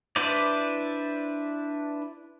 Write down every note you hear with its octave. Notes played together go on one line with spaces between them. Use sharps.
D4 E4 B4 C5 D5